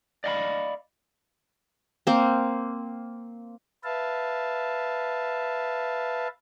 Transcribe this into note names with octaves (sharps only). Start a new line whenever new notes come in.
D5 D#5 F5 F#5 B5
A#3 C4
B4 E5 F5 A5